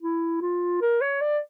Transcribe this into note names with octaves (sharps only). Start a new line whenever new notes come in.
E4
F4
A#4
C#5
D5